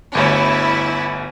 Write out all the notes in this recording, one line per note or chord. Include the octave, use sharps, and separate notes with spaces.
G1 D2 E4 C#5